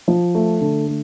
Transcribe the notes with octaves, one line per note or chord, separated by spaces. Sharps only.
F3
A3
D3
A3